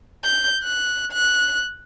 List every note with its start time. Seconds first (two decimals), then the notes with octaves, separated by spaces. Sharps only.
0.24 G6
0.63 F#6
1.12 F#6